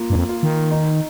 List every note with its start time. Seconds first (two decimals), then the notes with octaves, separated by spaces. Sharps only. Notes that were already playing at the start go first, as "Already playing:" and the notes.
Already playing: A#3 F4
0.10 G2
0.16 F2
0.29 F4
0.43 D#3
0.71 D#4